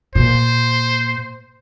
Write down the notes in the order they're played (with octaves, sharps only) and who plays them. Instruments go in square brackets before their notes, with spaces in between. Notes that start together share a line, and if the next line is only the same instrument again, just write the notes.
[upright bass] A#2 [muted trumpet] C5